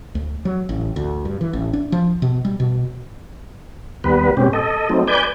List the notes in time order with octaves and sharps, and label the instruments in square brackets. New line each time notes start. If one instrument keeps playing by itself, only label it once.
[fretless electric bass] D2
F#3
A1
D2
G2
E3
A1
D4
F3
B2
G3
B2
[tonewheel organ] D#2 G3 B3 B4
G#2 B2 C4 C#4 G4
A4 D#5
F#3 A3 C4 D#4
B4 D5 G#5 G6